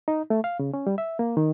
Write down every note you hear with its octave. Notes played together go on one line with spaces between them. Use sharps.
D#4
A3
F5
C#3
C#4
G3
E5
A#3
D#3